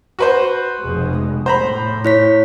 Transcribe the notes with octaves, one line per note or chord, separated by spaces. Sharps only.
F#4 B4 C5
F1 B2 G#3
A2 C5 A#5 B5
E4 C#5 B6